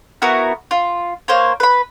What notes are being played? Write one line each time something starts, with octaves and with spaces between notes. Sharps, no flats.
B3 E4 F#4 A#4
F4
A#3 C5 C#5
B4 B5